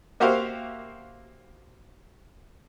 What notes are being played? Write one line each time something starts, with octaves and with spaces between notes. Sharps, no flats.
A#3 F#4 G4 C5 E5 F5